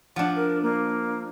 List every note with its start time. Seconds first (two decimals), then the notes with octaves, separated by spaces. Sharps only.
0.16 F3 D4 F#5
0.36 A#4
0.63 A#3